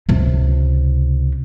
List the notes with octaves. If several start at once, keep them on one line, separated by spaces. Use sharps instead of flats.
C#2 C3